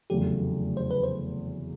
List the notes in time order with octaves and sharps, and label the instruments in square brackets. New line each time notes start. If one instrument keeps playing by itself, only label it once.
[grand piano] F1 E2 C#3 F#3 A3 [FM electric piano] G4
[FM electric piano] C5
B4
C5